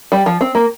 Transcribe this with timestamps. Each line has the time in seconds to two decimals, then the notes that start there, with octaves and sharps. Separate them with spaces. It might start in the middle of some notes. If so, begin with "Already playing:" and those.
0.12 G3
0.26 F3
0.41 C4
0.55 A#3